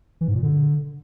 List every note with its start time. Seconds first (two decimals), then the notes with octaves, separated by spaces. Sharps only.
0.21 E3
0.28 G#2
0.35 A#2
0.43 D3